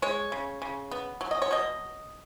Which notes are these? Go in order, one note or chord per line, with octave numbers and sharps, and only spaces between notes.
G#3 C#5
C#3
C#3
B3
F#3
D#5
C#5
B2 D#5